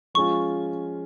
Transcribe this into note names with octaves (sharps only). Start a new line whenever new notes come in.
F3 G#3 C#4 F4 C#6